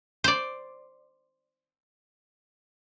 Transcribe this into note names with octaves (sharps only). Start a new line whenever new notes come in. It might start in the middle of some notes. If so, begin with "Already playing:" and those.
C5 D5